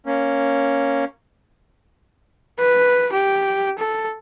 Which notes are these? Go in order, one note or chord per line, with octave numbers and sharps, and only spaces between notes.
A#3 C#4
B4
G4
A4